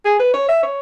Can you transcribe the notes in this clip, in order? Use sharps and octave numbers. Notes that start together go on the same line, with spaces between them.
G#4
B4
C#5
E5
C#5